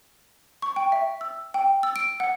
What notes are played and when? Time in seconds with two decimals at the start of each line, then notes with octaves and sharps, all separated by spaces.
0.62 C#6
0.76 G5
0.92 E5
1.21 E6
1.54 G5
1.83 E6
1.96 D7
2.20 F#5